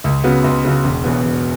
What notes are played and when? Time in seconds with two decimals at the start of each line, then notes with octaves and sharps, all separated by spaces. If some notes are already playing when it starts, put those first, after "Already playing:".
0.04 C#2
0.24 C#3 F#3 B3
0.44 C#2
0.65 C#3 F#3 B3
0.84 E1
1.04 E2 B2 F#3 B3
1.25 E1